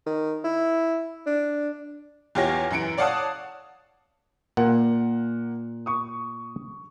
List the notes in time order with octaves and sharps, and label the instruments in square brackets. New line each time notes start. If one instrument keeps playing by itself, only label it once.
[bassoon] D#3
E4
D4
[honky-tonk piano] E2 F4 G4 C#5 A#6
F#2 E3 C#7 D7
C#5 D5 F5 F#5 A5 D#6
[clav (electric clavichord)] A#2 [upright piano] A#3 F#5
[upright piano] C#6 D#6